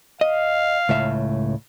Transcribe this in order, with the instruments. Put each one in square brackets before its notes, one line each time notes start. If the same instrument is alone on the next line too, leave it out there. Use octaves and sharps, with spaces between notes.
[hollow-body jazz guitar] D#5 [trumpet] F5
[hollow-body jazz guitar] C#2 A2 E5